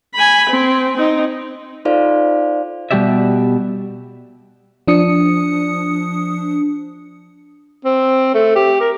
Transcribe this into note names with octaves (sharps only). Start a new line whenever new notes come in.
G#5 B5
C4
C4 D#4
D#4 F4 A4 C5 D5 F5
B2 G3 F#4 G4 D5 E5
F3 D4 D#6 C#7
C4
A3
G4
A#4